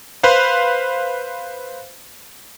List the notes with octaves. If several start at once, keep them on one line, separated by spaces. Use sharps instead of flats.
B4 C5 F5